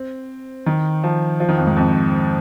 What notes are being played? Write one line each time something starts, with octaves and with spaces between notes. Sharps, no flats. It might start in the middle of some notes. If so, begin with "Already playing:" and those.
Already playing: C4
D#3
F3
F3
D#3
F2
G#2
F2